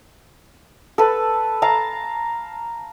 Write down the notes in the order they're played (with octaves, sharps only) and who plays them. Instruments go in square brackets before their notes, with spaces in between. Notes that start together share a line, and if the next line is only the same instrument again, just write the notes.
[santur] A4 B4
F5 A5 A#5